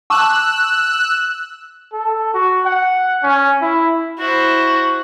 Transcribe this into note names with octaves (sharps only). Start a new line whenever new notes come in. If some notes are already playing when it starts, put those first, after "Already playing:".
A5 C#6 D6 E6 F#6
A4
F#4
F#5
C#4
E4
E4 F#4 C5